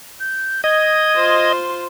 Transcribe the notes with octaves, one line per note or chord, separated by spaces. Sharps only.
G6
D#5 G#6
F4 C5